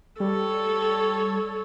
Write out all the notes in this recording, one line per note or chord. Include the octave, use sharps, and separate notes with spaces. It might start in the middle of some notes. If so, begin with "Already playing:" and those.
G3 A4 C#5